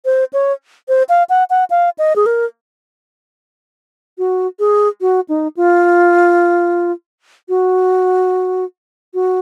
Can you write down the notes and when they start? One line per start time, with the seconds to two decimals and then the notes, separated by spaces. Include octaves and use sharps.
0.05 C5
0.33 C#5
0.89 C5
1.09 F5
1.29 F#5
1.50 F#5
1.70 F5
1.99 D#5
2.16 G#4
2.26 A#4
4.18 F#4
4.59 G#4
5.01 F#4
5.29 D#4
5.57 F4
7.49 F#4
9.14 F#4